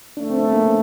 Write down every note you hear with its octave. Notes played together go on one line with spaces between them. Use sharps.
D2 C#3 F3 A3 D4
C4
B3
A#3